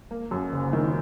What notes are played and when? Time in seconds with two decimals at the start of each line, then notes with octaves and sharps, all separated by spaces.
0.11 A#3
0.31 F#2
0.52 F#1
0.73 D#3